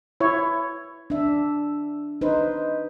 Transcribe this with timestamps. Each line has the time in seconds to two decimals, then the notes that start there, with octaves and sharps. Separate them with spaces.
0.20 E4 C#5
1.10 D4 E5
2.21 D#4 B4 C5